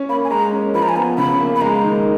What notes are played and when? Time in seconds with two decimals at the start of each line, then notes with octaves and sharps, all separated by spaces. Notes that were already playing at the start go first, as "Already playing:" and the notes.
Already playing: C#4
0.09 A#3 B5
0.24 G#5
0.30 G#3 A#5
0.52 C#4
0.74 F3 B5
0.82 A#5
0.89 G#5
0.96 B3 A#5
1.18 C#3 B5
1.40 A#3
1.56 B5
1.61 G#3 A#5
1.84 D#3